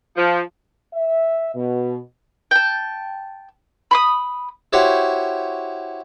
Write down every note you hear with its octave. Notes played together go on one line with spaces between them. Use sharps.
F3
E5
B2
G5 A5
B5 C6 D#6
E4 F#4 G4 C5 C#5